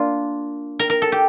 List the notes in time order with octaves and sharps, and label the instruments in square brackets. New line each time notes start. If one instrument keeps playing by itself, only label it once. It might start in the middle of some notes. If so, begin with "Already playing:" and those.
Already playing: [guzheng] A#3 D4 F4
A#4
A#4
A4
G4